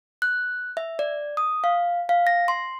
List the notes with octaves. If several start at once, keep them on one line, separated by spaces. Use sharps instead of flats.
F#6
E5
D5
D#6
F5
F5
A#6
C6